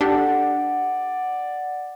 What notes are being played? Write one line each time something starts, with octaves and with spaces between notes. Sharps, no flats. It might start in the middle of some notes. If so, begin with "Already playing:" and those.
D4 G4 A4 D5 F#5